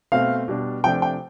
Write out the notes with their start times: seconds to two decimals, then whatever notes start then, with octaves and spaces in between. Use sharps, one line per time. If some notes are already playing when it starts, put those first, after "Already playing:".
0.12 B2 A3 C4 F5
0.48 B2 G3 D4
0.84 C3 F3 A3 D4 G5
1.02 G5